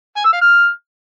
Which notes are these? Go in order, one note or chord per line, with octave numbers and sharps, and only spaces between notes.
G#5
E6
F5
F6